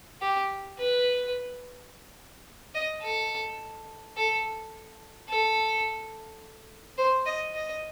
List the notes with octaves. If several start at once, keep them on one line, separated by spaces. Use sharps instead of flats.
G4
B4
D#5
A4
A4
A4
C5
D#5
D#5